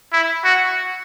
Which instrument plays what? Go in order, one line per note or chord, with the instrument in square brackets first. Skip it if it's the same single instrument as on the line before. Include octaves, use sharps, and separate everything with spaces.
[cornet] E4
F#4